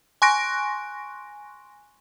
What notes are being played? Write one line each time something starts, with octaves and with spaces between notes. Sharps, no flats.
G#5 C6 C#6 F#6 A#6 D7